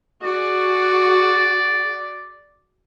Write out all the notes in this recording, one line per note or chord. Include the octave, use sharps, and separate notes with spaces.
F#4 G#4 D5